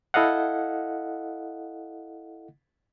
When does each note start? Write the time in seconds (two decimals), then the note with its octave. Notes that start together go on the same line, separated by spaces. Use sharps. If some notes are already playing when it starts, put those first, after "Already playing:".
0.14 E4 A4 D#5 F5 F#5